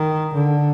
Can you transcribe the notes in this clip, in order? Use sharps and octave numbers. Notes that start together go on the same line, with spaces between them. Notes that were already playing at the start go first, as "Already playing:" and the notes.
Already playing: D#3
D3